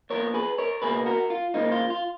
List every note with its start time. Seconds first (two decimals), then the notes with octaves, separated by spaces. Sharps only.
0.10 A#2 F3 B3 A#4 C#5
0.34 G#4 B4
0.58 A#4 C#5
0.82 C#2 B2 A#3 G#4 B4
1.06 F#4 A#4
1.30 F4
1.54 C#2 C#3 F3 A#3 D#4
1.72 F4
1.90 F4